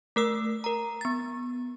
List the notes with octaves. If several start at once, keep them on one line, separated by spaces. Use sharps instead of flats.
A3 A#4 E6
A#4 A#5
B3 A6